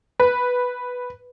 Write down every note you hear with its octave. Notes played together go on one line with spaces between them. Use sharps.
B4